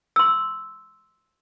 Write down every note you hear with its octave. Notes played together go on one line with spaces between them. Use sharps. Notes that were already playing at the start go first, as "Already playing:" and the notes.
C6 E6